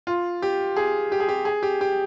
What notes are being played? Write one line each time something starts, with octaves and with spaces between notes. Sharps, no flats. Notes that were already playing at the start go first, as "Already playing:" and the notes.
F4
G4
G#4
G4
G#4
G4
G#4
G4
G4